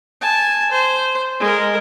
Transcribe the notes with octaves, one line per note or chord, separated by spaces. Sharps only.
G#5 A5
C5
G#3 A#4